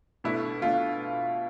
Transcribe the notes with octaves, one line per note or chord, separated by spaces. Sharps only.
B2 A3 D4 E4
B2 A3 D4 F4